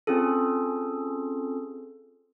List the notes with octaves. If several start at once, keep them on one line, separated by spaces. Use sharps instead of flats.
C4 C#4 F4 G#4 A4